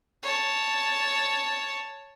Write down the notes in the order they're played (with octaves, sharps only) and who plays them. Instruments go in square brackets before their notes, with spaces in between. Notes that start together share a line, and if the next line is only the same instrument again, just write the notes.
[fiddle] C#5 A5